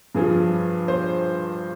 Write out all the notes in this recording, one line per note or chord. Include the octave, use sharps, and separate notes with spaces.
G2 F3 G#4
C5